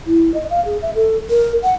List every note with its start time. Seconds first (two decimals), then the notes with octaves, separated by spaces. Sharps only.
0.06 E4
0.34 D#5
0.50 F5
0.65 G#4
0.82 E5
0.95 A4
1.30 A#4
1.63 F#5